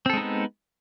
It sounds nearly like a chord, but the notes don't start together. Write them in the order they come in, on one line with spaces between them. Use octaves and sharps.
C4 A4 G#3 D#4 B3